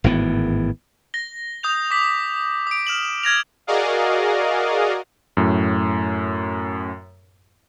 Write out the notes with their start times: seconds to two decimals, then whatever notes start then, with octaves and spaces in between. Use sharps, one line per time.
0.04 G#1 A2 E3 B3
1.14 A#6 G7
1.63 D#6 G6 F7
1.91 D6 B6 F#7
2.67 D#6 D7
2.87 F6 E7 F#7
3.23 F6 G#6 A#6 F7
3.67 F#4 G#4 A#4 D5 D#5 F5
5.37 F#2 A2